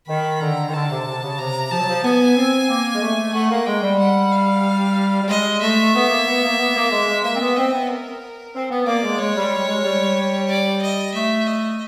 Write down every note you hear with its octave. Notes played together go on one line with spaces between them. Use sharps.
D#3 B5
D3 A#5
D#3
D3 A5
C3
C3
C#3
C3 A#5
F3 A5
F#3
F3
B3 G#5
C4
A#3
G#3
A3
A3 F#5
A#3
G#3 G5
G3
F#5
F5
G3
G#3 D#5
A3 E5
B3
A#3
B3
A#3
B3
A#3
G#3
G#3
A#3 E5
C4
B3
C4 D#5
B3
A#4
C4
B3
A#3 D5
G#3
G#3 C#5
G3
G3
G#3
G3
D5
D#5
A3 E5
D#5